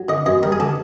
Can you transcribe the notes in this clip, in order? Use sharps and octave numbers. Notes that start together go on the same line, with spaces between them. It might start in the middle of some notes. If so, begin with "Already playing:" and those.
Already playing: F#3
D3 D#5
F#2 D#5
G3 A#4
G#4
D3 A4